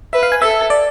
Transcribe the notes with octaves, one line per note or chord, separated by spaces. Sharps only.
B4 E5
F5
G#5
A4 E5
D5